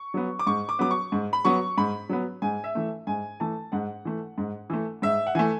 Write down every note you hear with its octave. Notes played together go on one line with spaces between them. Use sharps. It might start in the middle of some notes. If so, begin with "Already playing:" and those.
Already playing: C#6
F#3 B3
D6
G#2 C#6
D6
F#3 B3 D6
C#6
G#2
B5
F#3 B3 C#6
G#2 B5
F#3 B3
G#2 G#5
E5
E3 A3
G#2 G#5
E3 A3 A5
G#2 F#5
E3 A3
G#2
E3 A3
G#2 E5
F#5
E3 A3 G#5